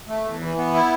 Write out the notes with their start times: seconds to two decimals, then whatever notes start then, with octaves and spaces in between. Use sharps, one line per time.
0.08 A3
0.24 E2
0.41 E3
0.57 B3
0.74 E4